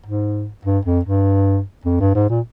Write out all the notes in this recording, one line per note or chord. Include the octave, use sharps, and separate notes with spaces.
G#2
G2
F2
G2
F2
G2
G#2
A#2